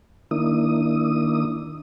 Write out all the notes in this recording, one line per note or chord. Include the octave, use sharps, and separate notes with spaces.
D#3 A#3 D4 E4 D#6